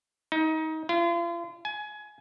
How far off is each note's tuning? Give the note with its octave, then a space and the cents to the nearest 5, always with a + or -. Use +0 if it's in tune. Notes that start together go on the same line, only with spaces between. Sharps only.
D#4 +25
F4 -40
G#5 +25